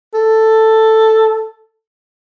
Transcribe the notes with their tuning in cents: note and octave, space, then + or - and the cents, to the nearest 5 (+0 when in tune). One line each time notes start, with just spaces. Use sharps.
A4 +5